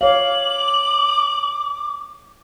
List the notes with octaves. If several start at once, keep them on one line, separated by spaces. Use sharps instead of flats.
C#5 F5 D6 F#7